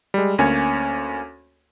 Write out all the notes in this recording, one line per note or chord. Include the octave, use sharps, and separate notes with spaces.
G3 G#3
D2 A#3 C#4 C#5 G#5